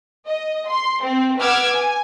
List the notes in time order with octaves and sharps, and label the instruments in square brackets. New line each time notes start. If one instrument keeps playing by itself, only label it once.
[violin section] D#5
C6
C4
B4 F#5 D6 E6 F6 G#6
G#5